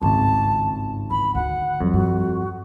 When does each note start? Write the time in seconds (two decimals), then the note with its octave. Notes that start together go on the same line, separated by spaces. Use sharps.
0.02 G#1 C#2 G2 C4 A5
1.11 E3 B5
1.35 D2 D#3 F#5
1.81 F2 F#3
1.93 G2 F#4